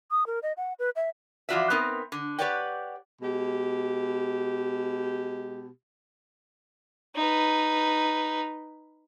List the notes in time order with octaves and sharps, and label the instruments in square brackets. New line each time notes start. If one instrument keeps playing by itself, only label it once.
[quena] D#6
A#4
D#5
F#5
B4
E5
[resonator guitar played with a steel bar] E3 F3 F4 F#4 D5 E5
B3 C4 D#4 A#4
D3
G4 B4 C#5 D5 F#5 G5
[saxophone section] B2 G#3 G4
[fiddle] D#4 B4